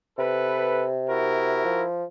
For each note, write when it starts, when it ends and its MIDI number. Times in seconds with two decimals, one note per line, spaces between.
0.18 1.62 48
0.18 0.88 69
0.18 0.88 71
1.09 1.84 64
1.09 1.84 66
1.09 1.84 70
1.65 2.05 53